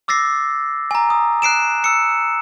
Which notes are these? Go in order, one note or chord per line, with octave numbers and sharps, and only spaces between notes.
D6 E6 A6 A#6 C7
G#5 A#5
D#6
F#6 C7 D7 E7
E6 C#7